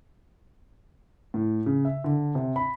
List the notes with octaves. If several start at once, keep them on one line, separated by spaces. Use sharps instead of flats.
A2
C#3
E5
D3
C3
B5